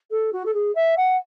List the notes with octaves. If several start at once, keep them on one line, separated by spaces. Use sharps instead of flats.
A4
F#4
A4
G#4
E5
F#5